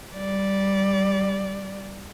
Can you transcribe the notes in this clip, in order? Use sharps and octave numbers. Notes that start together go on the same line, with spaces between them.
G3 D5